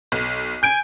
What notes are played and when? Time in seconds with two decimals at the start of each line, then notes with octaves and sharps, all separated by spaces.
0.12 B1
0.63 G#5 G6 D7